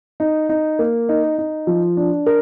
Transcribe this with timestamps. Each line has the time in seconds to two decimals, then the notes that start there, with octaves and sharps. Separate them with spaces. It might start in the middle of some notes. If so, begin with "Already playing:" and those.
0.20 D#4
0.49 D#4
0.79 A#3
1.09 D#4
1.38 D#4
1.67 F3
1.97 D4
2.26 A#4